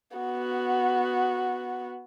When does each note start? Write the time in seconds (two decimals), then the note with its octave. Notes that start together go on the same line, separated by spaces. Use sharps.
0.17 B3 F#4